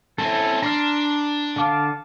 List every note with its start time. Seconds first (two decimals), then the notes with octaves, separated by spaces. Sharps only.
0.18 C4 C#4 E4 A4
0.62 D4 A#5 C6 F6
1.56 D3 F5 A5 D6